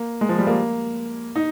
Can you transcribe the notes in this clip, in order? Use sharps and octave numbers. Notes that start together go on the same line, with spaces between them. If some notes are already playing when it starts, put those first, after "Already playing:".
Already playing: A#3
G#3
F3
G3
A#3
D#4